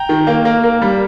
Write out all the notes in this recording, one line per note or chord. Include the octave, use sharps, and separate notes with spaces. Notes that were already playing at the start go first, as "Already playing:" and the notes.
Already playing: G5 A#5
D#3
A#3
A#3
A#3
G3